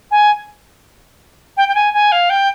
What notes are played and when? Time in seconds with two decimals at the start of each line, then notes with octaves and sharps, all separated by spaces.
0.11 G#5
1.57 G5
1.69 G5
1.75 G#5
1.94 G#5
2.12 F5
2.30 G5